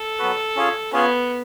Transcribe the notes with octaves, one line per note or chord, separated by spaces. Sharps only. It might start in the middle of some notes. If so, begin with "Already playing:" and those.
Already playing: A4
F#3 B3 F#4 B4
C#4 F4 G#4 C#5
B3 C#4 F4 G#4 C#5